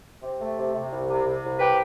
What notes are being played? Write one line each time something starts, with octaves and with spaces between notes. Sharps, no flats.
C3
A3
C3
C3
C2
C3
C3
C2
G4 B4